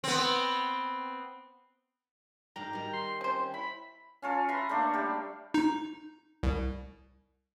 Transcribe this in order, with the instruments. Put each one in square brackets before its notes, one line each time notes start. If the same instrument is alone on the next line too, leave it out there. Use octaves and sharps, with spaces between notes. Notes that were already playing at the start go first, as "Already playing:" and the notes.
[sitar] B3 C4
[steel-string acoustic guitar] G#2 D4 F5 [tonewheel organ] G5 [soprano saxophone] A#5
[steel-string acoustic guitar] D#3 G3
[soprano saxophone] C6
[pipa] C4 C5 [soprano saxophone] C#4
[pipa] E4 [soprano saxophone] B5
[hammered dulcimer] C#4 F4 A4
B4 E5 A#5 C6
A3 A#3 D4 A4
G3 G4
[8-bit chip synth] D#4
C2